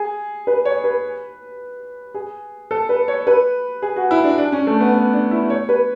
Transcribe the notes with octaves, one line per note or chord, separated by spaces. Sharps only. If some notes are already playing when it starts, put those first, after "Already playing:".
Already playing: G#4
B4
C#5
B4
G#4
A4
B4
C#5
B4
G#4
F#4
E4
D4
D4
C#4
A3
B3
B3
D4
E4
C#5
B4